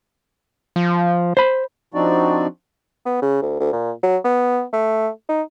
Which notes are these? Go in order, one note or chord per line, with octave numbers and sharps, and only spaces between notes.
F3
C5 B5
F3 C4 D4 D#4 F#4 D5
B3
C#3
D2
D2
A#2
F#3
B3
A3
D#4